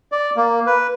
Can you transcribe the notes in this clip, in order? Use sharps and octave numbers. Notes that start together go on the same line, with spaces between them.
D5
A#3
B4